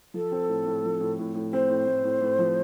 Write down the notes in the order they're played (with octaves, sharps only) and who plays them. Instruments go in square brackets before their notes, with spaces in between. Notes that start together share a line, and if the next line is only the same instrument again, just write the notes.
[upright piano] F3 [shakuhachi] A4
[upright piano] C4
A2
A2
F3
A2
A2
A2
[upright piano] C4 [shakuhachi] C5
[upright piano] A2
A2
A2
A2
F3